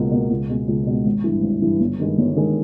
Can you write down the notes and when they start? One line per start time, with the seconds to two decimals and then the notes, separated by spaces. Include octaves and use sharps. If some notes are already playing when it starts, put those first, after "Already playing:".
Already playing: C#2 B2 A#3
0.11 B2 A#3
0.30 C#2
0.49 B2 G#3
0.68 C#2
0.87 B2 G#3
1.05 G#1
1.24 G2 E3
1.42 G#1
1.62 G2 E3
1.80 G1
2.00 G2 D#3 G#3
2.18 G1
2.36 G2 D#3 G#3